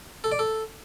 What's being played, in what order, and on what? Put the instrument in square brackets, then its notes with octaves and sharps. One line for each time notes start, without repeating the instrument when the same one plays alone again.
[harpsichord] A4
D5
A4